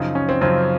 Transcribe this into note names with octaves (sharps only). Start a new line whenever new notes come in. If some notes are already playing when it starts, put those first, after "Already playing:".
Already playing: F#2 C#3 F3 D#4
C#4
C4
F#2 C#3 F3 C4